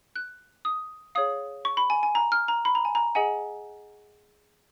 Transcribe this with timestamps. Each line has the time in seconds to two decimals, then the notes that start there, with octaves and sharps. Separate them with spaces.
0.16 F#6
0.65 D#6
1.15 G#4 C#5 F5 D#6
1.65 C#6
1.77 B5
1.90 G#5
2.03 G#5
2.15 A#5
2.32 F6
2.48 A#5
2.65 B5
2.75 A#5
2.85 G#5
2.95 A#5
3.15 G#4 D#5 F#5 G#5